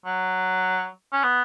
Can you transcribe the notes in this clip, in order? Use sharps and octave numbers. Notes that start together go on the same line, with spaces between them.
F#3
C#4
B3